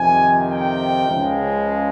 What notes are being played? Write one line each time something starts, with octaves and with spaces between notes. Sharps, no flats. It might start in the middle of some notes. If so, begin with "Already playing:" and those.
Already playing: F2 C3 D#3 G#5
G5
C#2 C#3 F3 G#3